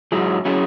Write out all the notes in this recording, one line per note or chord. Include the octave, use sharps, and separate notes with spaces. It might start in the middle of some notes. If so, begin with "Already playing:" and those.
G#2 F#3 E4 G#4
F#3 C#4 E4 G#4